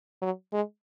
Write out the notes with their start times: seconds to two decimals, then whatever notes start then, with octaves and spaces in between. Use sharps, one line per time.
0.22 F#3
0.53 G#3